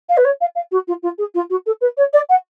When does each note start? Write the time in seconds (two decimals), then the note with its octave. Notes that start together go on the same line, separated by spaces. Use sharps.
0.09 F5
0.17 B4
0.24 C#5
0.41 F5
0.55 F5
0.71 F#4
0.87 F4
1.02 F4
1.18 G#4
1.34 F4
1.50 F#4
1.66 A4
1.81 B4
1.97 C#5
2.13 D5
2.29 F#5